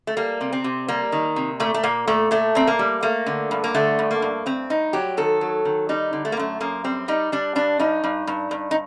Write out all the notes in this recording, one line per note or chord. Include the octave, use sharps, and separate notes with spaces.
A3
G3 A#3
C3
C4
C3
G3 A#3
D#3
C3
A#2 A3
A3
A#2 A#3
A#2 A3
A#2 A3
A#2 C4
A#3
G3
A3 A#3
D3
G2
A#3
D3 A3
G2
A#3
G2
G2 C4
G2 D#4
F#3 G4
D#3 A4
F#3
D#3
G3 D#4
D3
A3
A#3
F#2 A3
F#2 A#3
G3 C4
G3 D#4
G3 D4
G2 D4
G2 D#4
G2
G2
G2
D#4